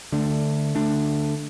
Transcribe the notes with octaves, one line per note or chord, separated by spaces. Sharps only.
D3 A3 D4
D3 A3 D4